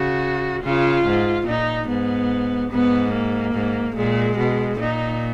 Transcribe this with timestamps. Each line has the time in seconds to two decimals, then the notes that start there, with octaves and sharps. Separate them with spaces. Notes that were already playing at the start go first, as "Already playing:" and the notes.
Already playing: C#3 F#4
0.63 C#3 F4
1.05 G#2
1.46 A#2 D#4
1.88 G#2 B3
2.71 G#2 B3
3.13 A#3
3.54 G#2
3.96 A#2 G#3
4.38 B2
4.79 A#2 D#4